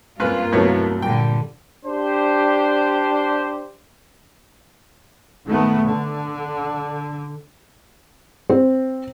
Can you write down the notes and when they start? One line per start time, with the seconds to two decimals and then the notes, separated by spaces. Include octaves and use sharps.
0.20 C#2 G2 A#3 C4 F4 B4
0.52 C2 A2 F#3 A3 B3 C#5
1.02 A#2 D3 G3 G5
1.86 D4 G4 C5
5.47 D#3 A3 B3
5.86 D3
8.50 C4